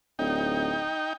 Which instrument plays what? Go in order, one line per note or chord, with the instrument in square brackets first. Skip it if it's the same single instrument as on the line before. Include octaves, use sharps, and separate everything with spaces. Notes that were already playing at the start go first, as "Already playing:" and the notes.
[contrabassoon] D1 [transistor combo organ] D#4 G5